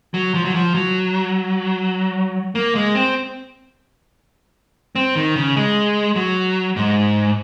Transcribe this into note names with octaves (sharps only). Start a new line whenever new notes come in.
F#3
F3
F#3
F3
F#3
A#3
G#3
C4
C4
D#3
C#3
G#3
F#3
G#2